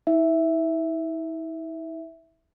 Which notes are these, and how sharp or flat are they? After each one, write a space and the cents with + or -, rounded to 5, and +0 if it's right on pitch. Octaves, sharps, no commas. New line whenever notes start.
E4 -40 E5 +0